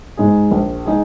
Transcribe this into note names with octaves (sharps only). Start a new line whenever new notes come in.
G#2 G#3 D#4 G#4
A#1
G#3 D#4 G#4